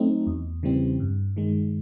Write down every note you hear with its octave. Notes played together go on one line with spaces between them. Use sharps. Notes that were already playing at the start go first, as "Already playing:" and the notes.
Already playing: F#3 A3 C4 D#4
E2
C#3 E3 G3 C4
G2
D#3 G#3